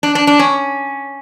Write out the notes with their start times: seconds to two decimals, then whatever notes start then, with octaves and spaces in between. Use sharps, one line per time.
0.03 D4
0.15 D4
0.27 D4
0.39 C#4